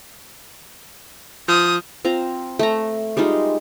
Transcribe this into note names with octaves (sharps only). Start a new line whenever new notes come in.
F3 D#6
C4 F4 A#5
A3 A#5
G3 G#3 D#4 F4